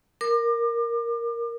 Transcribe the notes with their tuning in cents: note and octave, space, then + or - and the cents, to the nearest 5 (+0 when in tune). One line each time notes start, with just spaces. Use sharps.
A#4 +0 D6 +35